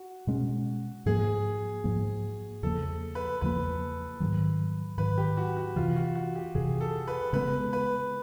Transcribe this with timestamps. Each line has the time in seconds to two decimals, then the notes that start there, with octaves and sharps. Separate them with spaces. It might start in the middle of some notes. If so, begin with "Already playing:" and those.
Already playing: F#4
0.27 B2 G#3 C#4
1.06 G#2 F3 A#3 G#4
1.84 G#2 F3 A#3
2.63 E2 C#3 F3 A#3 A4
3.15 B4
3.41 E2 C#3 F3 A#3 B4
4.20 G#2 D#3 F#3
4.98 G#2 D#3 F#3 B4
5.18 G4
5.37 F#4
5.57 F#4
5.76 F2 C3 E3 F4
5.96 F#4
6.15 F#4
6.35 G4
6.55 F2 C3 E3 G#4
6.81 A4
7.08 B4
7.33 C#3 E3 G#3 B3 B4
7.73 B4